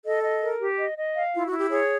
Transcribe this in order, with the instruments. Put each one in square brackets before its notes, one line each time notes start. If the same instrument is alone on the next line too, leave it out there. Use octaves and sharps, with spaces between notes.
[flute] A4 [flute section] D#5
[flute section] D#5
A#4
G4
D#5
D#5
F5
[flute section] E4 [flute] F4
[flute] F#4
[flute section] E4
[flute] G4
[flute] G#4 [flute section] C#5